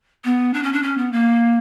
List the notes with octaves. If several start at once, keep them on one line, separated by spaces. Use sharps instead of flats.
B3
D4
C#4
D4
C#4
B3
A#3